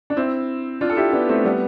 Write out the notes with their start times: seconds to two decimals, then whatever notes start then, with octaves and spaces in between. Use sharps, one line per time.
0.10 D4
0.16 C4 E4
0.81 D4 F4
0.90 A4
0.97 E4 G4
1.13 B3 D4
1.29 A3 C4
1.44 G3 B3